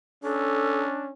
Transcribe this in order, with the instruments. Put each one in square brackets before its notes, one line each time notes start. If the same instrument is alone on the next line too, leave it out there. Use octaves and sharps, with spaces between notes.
[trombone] C#4 [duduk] D4 [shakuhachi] A4